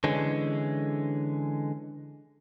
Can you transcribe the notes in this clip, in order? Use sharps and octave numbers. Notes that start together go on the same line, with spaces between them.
D3 E3 G#3 C#4